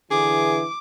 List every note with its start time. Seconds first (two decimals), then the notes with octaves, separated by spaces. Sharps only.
0.11 D3 E3 G#4 D6